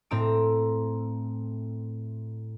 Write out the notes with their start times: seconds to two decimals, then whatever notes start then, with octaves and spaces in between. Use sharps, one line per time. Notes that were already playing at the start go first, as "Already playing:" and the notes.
0.11 A2 C4 A#5 E6 D7